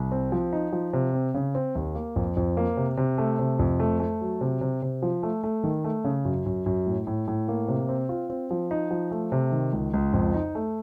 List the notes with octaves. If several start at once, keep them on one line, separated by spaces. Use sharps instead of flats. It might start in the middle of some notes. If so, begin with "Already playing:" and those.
Already playing: C2
C4
F3
D#4
F3
C3
C4
C#3
C4
D#2
A#3
F2
F2
A#3
C3
C3
A3
C3
F2
A3
A3
F#3
C3
C3
C3
F3
A3
A3
D#3
A3
C#3
F#2
F#2
F#2
A2
A2
A2
A#3
C3
C4
F4
C4
F3
D#4
F3
A3
C3
D#3
C#2
C#2
F2
D#4
A3